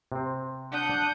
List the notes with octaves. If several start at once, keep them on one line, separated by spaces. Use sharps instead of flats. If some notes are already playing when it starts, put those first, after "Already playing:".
C3 C4
D4 F#5 D#6 G6